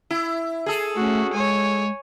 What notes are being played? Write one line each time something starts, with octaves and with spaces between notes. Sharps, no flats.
E4
G#4 A4
A3 C#4 F#4
G#3 C#5 G#5